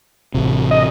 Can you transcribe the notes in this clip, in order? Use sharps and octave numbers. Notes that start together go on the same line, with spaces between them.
A1 C3
D#5